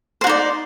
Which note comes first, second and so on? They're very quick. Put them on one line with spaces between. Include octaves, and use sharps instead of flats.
C5 F#4 D#4 D5